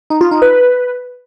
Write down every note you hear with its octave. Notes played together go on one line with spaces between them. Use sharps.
D#4
F4
D#4
B4